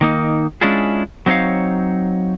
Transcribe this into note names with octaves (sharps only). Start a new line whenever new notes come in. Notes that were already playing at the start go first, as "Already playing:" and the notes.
D#3 A#3 D#4
G#3 C#4 D4 E4 F4 G#4
F#3 C4 D#4 G#4 C#5 F5